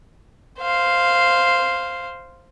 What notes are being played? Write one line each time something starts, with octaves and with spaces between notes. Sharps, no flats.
C5 F5